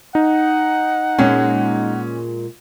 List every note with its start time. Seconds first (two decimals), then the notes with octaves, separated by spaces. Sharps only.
0.15 D#4 F#5
1.19 A#2 G#3 C#4